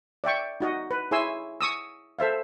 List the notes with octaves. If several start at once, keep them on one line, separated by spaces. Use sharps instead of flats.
D5 E5 G5 C#6
D#4 F#4 D#5
B4
E4 G#4 C#5 G#5 C6 E6
C#6 D#6 E6
A4 C5 E5 F5